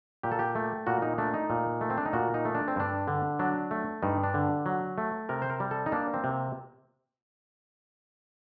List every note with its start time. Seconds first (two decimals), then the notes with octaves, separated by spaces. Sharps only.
0.23 A#2 G4
0.32 A4
0.39 G4
0.55 A3
0.87 A#2 F#4
1.02 D#4
1.18 A3 D4
1.34 D#4
1.50 A#2
1.81 A3
1.90 C4
1.98 D4
2.05 D#4
2.13 A#2 F#4
2.34 D#4
2.45 A3
2.55 D4
2.68 C4
2.76 G2 D4
3.08 D3
3.39 F#3 D4
3.71 A3
4.02 G2 D#4
4.24 D4
4.34 D3
4.66 F#3
4.98 A3
5.29 C3 A#4
5.42 C5
5.50 A#4
5.60 G3
5.71 A4
5.86 D#4
5.92 A#3 D4
6.14 C4
6.24 C3